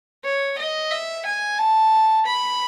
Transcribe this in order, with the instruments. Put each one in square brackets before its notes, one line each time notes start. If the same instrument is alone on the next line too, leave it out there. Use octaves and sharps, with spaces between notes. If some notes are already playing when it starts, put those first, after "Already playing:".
[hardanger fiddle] C#5
D#5
E5
G#5
A5
B5